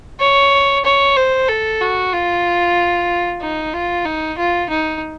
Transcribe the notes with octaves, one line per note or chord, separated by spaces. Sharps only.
C#5
C#5
C5
A4
F#4
F4
D#4
F4
D#4
F4
D#4